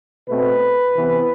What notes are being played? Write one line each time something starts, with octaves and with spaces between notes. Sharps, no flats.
B2 A3 C4 B4
C3 E3 B3